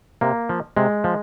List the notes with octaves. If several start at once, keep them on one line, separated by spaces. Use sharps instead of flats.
C3 A#3
F3
C3 G#3
F3